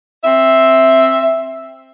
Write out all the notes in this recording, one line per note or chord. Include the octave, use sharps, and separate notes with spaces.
C4 E5